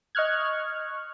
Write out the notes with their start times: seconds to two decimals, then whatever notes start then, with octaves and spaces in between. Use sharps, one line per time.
0.15 D#5 C#6 F6 F#6 G#6